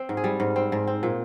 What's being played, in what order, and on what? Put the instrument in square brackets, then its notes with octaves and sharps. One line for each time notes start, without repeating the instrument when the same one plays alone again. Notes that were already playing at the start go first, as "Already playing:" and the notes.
Already playing: [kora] C4
G#2
G#4
G3
G#2
C4
G#2
C4
A#2